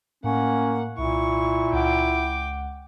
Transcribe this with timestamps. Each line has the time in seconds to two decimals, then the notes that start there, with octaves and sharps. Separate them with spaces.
0.24 A2 A#3 C#4 F#5
0.98 C2 A#2 E4 C#6
1.73 C#2 F#5 G5 D6